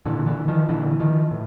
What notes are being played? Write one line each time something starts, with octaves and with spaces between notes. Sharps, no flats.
A#2 D3 E3
D3 E3
D#3 F3
A#2 D3 E3
D#3 F3
A2